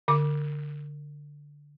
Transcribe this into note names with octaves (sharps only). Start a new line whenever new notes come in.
D3 D6